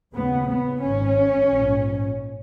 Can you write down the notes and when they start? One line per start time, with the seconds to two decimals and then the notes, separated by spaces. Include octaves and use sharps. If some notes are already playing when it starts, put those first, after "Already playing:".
0.15 D#2 C#3 B3
0.49 B3
0.83 G#1 G#2 C#4
1.51 A#1 G#2